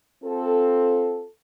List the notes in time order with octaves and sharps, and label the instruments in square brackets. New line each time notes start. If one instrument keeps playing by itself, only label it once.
[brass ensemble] C4 F4 A4